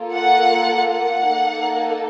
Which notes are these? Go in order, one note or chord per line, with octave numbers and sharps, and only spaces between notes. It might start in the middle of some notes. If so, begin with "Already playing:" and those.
Already playing: A#3 F4 A4
F#5
F#5
A#3 D#4 A4